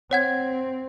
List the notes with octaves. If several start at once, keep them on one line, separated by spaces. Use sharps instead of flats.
C4 C#5 F#5 G#6